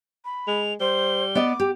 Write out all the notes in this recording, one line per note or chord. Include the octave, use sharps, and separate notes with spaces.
B5
G#3 F7
G3 C5 G7
B3 D5 D#5 D6
G4